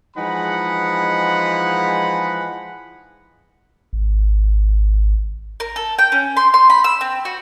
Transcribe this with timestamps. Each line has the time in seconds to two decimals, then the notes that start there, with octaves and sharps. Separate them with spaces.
0.17 E3 F3 G#3 D#4 F#5 B5
3.93 G#1
5.60 A#4
5.76 A4
5.98 G5
6.12 C#4
6.37 C6
6.54 C6
6.70 B5
6.84 E6
7.01 C4
7.25 F#4